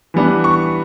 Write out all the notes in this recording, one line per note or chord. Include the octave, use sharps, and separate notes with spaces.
E3 G3 B3 D4
C#6